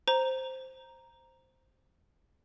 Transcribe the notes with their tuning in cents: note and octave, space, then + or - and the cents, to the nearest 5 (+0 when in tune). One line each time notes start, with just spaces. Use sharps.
C5 +0 A#5 +0